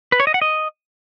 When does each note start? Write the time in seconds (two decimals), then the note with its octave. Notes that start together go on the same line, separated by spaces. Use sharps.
0.12 B4
0.20 C#5
0.27 D#5
0.34 F#5
0.42 D#5